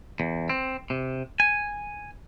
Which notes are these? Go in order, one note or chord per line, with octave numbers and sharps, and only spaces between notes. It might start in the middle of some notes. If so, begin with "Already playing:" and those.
E2
C4
C3
G#5